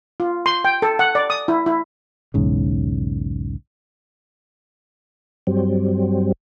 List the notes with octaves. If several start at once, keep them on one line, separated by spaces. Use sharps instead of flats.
F4
C6
G5
A4
F#5
D5
D#6
E4
E4
B1 E2 G#2 C#3
G2 F#3 G3 C4